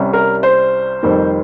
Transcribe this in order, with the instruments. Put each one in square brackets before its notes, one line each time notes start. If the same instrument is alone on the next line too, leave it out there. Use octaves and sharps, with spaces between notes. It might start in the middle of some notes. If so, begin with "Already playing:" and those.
Already playing: [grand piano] C2 C3 G3 C#4
A#4
C5
F1 F2 D#3 G3 C4